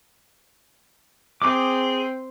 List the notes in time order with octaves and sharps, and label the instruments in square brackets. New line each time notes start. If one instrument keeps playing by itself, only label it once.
[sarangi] C4 [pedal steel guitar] G#4 D6